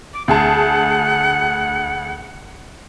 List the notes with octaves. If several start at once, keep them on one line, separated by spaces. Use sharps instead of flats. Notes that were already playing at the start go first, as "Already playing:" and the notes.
D6
D2 G#4 F#5 A5